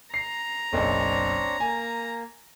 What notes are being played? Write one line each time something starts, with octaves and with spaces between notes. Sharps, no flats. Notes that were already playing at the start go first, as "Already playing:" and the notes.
A#5 C7
F#1 B1 C4 D4 C#5
A#3 G#5